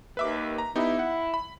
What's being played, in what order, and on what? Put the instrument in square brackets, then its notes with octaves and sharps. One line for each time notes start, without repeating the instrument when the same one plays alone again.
[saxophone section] D#2 [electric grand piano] B4 E5 D6
[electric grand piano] A#5
[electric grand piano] B3 D#4 G4 [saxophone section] E4
[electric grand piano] F#5
B5